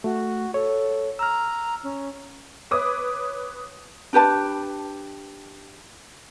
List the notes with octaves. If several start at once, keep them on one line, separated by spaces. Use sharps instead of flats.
A3 F#4
A4 C#5
A#5 E6 F6
C#4
B4 C#5 D6 D#6
D4 G4 B4 A5